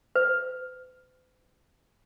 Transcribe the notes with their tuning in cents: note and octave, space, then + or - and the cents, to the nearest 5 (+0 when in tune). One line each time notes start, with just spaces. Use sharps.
C5 -45